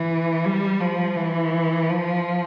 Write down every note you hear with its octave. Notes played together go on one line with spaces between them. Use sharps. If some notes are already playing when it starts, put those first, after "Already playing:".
Already playing: E3
G3
F3
E3
F3